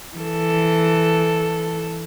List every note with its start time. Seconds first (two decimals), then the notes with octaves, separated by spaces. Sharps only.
0.17 E3 A4